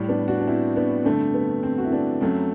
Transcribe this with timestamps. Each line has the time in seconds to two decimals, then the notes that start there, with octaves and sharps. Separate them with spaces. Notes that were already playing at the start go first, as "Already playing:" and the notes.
Already playing: A2 G3
0.09 B3 D4
0.28 D4 F#4
0.41 D4
0.47 C4 E4
0.76 B3 D4
1.05 G2 D3 A3 C4
1.34 B3
1.63 C4
1.78 F#4
1.85 E4
1.92 B3 D4
2.21 F#2 F#3 A3 C4